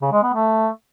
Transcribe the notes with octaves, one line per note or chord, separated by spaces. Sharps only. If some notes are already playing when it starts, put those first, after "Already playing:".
C#3
G#3
B3
A3